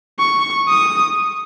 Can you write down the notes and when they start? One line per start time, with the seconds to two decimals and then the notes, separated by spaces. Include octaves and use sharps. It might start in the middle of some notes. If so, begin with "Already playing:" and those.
0.19 C#6
0.69 D#6